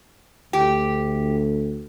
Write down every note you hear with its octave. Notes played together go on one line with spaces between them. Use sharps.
D2 G4